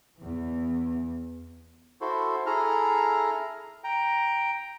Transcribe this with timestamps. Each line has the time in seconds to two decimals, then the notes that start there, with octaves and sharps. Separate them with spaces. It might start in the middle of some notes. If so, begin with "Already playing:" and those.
0.19 E2 E3
2.01 E4 F#4 A4 C5
2.46 E4 G#4 A4 A#5 F6
3.84 G5 A#5